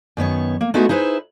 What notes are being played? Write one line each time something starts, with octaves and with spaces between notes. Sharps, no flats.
F#2 D#3 B3 C#5
A#3
G#3 A3 B3 D#4 E4 F#4
D#4 E4 G#4 B4 C5